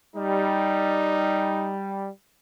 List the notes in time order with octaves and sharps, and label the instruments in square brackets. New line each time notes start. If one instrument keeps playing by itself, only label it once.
[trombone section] G3 [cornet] D#4